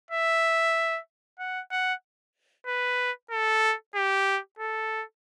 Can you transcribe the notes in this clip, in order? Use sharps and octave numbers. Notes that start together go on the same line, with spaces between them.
E5
F#5
F#5
B4
A4
G4
A4